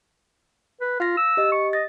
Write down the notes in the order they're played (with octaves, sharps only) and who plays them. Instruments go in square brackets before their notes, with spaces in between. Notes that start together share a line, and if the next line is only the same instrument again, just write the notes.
[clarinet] B4
[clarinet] F4 [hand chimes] F5 A#6
[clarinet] E6
[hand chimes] G4 D#5
[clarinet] C#6
[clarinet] D#5 [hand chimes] A6